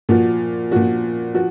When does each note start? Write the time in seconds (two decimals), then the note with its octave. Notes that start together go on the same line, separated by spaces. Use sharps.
0.09 A#2 F3 F#4
0.71 A#2 F3 F#4
1.34 F3 F#4